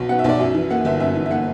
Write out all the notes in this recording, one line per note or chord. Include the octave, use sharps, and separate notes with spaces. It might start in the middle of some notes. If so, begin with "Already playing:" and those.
Already playing: B1 B2 F#3
B3 F#5
E5
B1 D5
F#2 E5
E3
A#3 F#5
G1 E5
F#2 E5
E3
E5
A#3 F#5